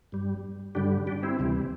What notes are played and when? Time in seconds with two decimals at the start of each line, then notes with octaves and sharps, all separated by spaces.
0.12 G2 G3
0.75 G2 D3 G3 D4 G4
1.07 D4 G4
1.23 C4 E4
1.39 D2 C3 E3 G3